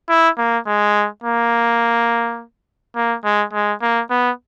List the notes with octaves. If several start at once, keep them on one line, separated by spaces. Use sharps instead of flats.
E4
A#3
G#3
A#3
A#3
G#3
G#3
A#3
B3